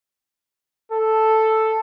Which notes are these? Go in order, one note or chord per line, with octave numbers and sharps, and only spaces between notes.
A4